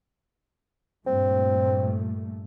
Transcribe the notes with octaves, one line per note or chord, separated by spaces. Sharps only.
G2 A#2 A3 C4